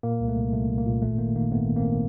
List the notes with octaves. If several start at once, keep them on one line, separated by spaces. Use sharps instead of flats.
A#2 A#3
C2
A3
C2
C2 A3
C2
A#3
A#2
G#1 A3
D#3 A#3
D#3 A#3
G#1 A3 B3
G#1
A#3 C4
D#3